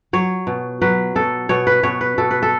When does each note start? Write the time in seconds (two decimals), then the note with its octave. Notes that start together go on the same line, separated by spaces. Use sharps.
0.13 F#3 C#5
0.47 B2
0.82 F#3 B4
1.15 B2 A4
1.49 B2 C#5
1.67 B4
1.83 B2 C#5
2.01 B4
2.18 B2 A4
2.31 B4
2.43 A4